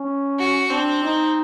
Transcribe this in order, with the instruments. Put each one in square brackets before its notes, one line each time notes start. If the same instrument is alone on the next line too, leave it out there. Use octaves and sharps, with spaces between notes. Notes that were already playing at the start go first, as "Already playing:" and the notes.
Already playing: [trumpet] C#4
[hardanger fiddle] F#4
[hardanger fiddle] C4 [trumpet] D4
[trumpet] D#4